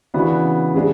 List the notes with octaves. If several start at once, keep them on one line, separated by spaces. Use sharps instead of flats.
C#3 E3 B3 D4 F#4
C#3 G#3 D4